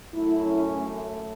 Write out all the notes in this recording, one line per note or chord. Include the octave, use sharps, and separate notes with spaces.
F#2 F#3 A3 E4
C#4
A3